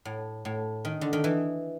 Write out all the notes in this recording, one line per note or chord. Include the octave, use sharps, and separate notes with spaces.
A2
A2
D#3
D3
D#3
E3